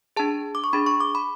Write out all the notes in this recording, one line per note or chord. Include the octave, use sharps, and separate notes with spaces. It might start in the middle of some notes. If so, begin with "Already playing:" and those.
D4 G#4 A5
D6
C#6
D4 G#4 B5
C#6
D6
B5